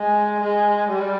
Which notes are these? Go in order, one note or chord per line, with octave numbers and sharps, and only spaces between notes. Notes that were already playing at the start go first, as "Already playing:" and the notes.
Already playing: G#3
G#3
G3